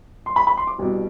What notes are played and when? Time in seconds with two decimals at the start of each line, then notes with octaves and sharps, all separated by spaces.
0.26 C6
0.36 B5
0.47 B5
0.57 C6
0.67 D6
0.78 C2 B2 G3